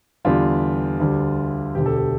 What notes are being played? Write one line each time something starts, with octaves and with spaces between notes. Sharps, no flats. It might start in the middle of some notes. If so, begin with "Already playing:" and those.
E2 D3 G3 F4
D2 D3 G3
E1 D2 D3 G4
A4
G4